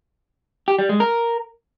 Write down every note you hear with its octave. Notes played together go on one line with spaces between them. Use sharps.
G4
G3
G#3
A#4